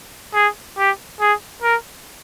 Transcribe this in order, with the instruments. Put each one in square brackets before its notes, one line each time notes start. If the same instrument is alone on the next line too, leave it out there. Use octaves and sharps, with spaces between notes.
[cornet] G#4
G4
G#4
A#4